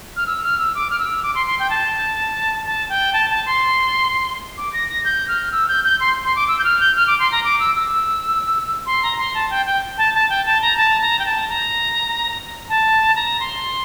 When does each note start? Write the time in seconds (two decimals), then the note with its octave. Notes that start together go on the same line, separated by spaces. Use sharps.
0.16 F6
0.27 E6
0.43 F6
0.58 E6
0.75 D6
0.90 F6
0.99 E6
1.23 D6
1.35 C6
1.47 C6
1.59 G5
1.70 A5
2.66 A5
2.89 G5
3.13 A5
3.30 A5
3.46 C6
4.57 D6
4.73 A#6
4.89 A#6
5.05 G6
5.28 F6
5.52 E6
5.69 G6
5.84 G6
6.00 C6
6.24 C6
6.36 D6
6.48 E6
6.59 G6
6.64 F6
6.80 G6
6.96 F6
7.07 D6
7.19 C6
7.32 A#5
7.44 D6
7.60 E6
7.75 E6
8.86 C6
9.03 A#5
9.18 C6
9.35 A5
9.50 G5
9.66 G5
9.98 A5
10.14 A5
10.30 G5
10.46 A5
10.62 A#5
10.77 A5
11.01 A#5
11.19 G5
11.26 A5
11.49 A#5
12.69 A5
13.16 A#5
13.40 C6